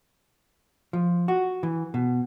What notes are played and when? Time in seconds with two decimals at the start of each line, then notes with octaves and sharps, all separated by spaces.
0.93 F3
1.28 F#4
1.63 E3
1.94 B2